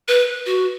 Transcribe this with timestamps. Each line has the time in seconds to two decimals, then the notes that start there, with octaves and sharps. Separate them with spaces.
0.08 B4
0.46 F#4